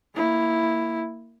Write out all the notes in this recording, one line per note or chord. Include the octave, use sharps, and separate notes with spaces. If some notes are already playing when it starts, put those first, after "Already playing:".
A#3 E4